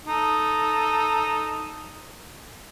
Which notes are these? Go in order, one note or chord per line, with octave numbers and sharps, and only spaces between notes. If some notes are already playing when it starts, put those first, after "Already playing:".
D#4 A4